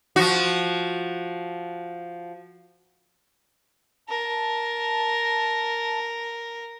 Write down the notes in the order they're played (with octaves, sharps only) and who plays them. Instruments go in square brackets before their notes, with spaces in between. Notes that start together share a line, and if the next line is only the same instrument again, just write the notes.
[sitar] F3 F#4
[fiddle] A#4 [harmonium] A5